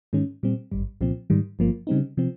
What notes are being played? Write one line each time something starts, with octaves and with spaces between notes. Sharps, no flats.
G#2 D#3 G#3 C#4
A#2 G3 C4
G#1 G2 G3
C2 A#2 F3 C4
G#2 D#3 G3
G1 G2 F3 A#3
C#3 G3 C4 D#4
C3 F3 C4